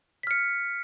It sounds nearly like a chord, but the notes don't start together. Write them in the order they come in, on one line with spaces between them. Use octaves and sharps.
B6 F6 C#7